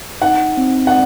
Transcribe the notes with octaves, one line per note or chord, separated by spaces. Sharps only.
D#4 F#5
C4
F#5